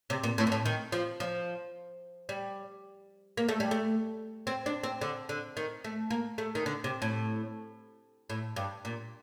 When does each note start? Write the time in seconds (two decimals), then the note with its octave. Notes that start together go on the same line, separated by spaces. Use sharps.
0.10 C3
0.23 A#2
0.38 A2
0.47 A#2
0.52 A2
0.65 D#3
0.92 F3
1.20 F3
2.29 G3
3.37 A#3
3.49 A3
3.60 G3
3.71 A3
4.47 C4
4.66 D4
4.83 C4
5.01 D3
5.29 D3
5.57 D#3
5.84 A3
6.11 A#3
6.38 A3
6.55 D#3
6.66 D3
6.84 C3
7.02 A2
8.30 A2
8.56 G2
8.85 A#2